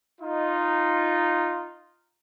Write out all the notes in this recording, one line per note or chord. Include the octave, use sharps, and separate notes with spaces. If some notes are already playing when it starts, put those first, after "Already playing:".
D#4 F4